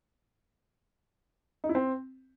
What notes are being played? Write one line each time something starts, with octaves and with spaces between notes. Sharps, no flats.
D#4
E4
C4